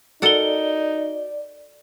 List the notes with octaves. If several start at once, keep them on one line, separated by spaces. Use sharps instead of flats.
D#4 F#4 A4 A#4 D5 F#5 G7